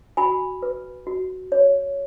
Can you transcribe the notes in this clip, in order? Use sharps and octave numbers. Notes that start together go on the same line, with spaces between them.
F#4 G#5 B5
B4
F#4
C#5